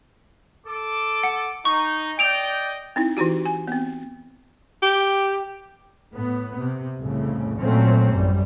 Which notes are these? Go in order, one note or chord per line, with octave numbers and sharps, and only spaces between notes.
A4 D6
F#5
D#4 C#6
D5 D#5 G5 D7 F7
C4 D#4 E4
E3 D#4 E4 F#4 G4
G#5
B3 C4
G4
A2 B3
C3
C2 F2 A2 C#3
A#2 F#3 A3 C4 C#4
A1 F#2 G3